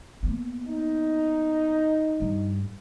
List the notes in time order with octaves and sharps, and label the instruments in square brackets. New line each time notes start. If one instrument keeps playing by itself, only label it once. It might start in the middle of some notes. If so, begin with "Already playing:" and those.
[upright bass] A#3 B3
[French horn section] D#4
[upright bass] G2